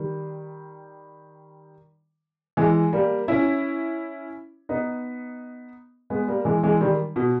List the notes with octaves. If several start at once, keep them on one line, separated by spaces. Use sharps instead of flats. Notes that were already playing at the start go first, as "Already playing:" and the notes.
Already playing: D#3 G3
E3 G#3
G3 A#3
C#4 E4
B3 D#4
G#3 B3
G3 A#3
E3 G#3
E3 G#3
D#3 G3
B2